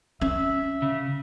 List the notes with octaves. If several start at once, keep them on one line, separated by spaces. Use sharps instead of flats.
C#4 E5
C#3